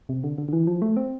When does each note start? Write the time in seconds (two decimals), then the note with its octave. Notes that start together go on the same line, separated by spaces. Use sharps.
0.09 C3
0.24 D3
0.38 D3
0.48 D3
0.53 E3
0.67 F3
0.82 A3
0.97 C4